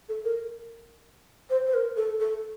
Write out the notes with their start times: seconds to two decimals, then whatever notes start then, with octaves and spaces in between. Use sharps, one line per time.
0.09 A4
0.24 A#4
1.49 C5
1.66 C5
1.73 A#4
1.96 A4
2.20 A4